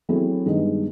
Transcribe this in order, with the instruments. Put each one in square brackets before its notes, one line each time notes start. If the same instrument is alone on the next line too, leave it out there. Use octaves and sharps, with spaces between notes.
[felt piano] F#3 A3 C4 E4 G#4
G2 D#3 G#3 B3 D#4